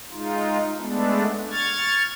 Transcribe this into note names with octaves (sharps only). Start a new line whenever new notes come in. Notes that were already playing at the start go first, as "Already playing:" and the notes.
G#3 D#4 F4
G#3 A3 B3 D4
C#6 F6 G#6 A6